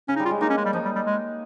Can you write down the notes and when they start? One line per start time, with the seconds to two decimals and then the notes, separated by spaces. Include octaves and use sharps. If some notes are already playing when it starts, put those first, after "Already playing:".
0.08 C#3 C#4
0.16 D#4
0.19 G3
0.25 F4
0.31 G#3
0.41 A#3 D#4
0.50 C#4
0.57 G#3
0.65 G3
0.73 F3 D#4
0.85 G3
0.96 G3
1.06 G#3